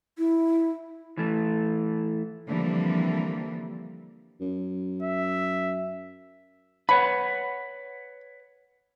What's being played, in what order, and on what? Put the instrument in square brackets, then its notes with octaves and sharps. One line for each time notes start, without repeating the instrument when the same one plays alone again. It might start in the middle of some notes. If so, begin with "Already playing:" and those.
[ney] E4
[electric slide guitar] E3 A3
[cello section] D3 E3 F3 G3 A#3 C4
[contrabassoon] F#2
[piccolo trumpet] E5
[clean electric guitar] B4 C#5 F#5 [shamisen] B5